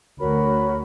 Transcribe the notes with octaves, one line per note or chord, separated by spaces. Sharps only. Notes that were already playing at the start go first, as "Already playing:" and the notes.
D2 F#4 A#4 C#5 B5